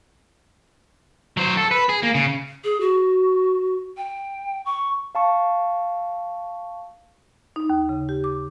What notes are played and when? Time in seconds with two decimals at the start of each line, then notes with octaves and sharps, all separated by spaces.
1.37 F#3 C5
1.57 A4
1.71 B4
1.89 G#4
2.03 A#3
2.14 C#3
2.64 G#4
2.81 F#4
3.97 G5
4.66 C#6
5.15 F5 A5 C#6
7.56 D#4
7.70 D#2
7.89 C#3
8.09 G4
8.24 D6